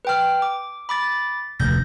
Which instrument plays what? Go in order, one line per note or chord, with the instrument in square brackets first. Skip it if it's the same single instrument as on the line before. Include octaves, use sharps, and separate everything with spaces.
[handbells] B4 G5 F6
D6
B5 D6 A6
[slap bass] F1 D2 [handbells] G6 A#6